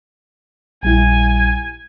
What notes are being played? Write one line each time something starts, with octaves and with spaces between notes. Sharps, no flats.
A#1 G3 E4 G#5